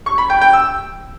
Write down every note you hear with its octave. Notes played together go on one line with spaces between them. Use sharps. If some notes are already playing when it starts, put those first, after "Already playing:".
C#6
B5
G5
G5
E6